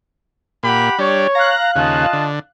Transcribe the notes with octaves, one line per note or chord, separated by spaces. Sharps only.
A#2 G4 F#5 B5
G3 D4 C#5
F5 A#5 F#6
D#2 C#3 F4 D#5 A5
D3